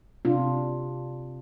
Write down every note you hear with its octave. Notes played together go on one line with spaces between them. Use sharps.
C3 D4 F4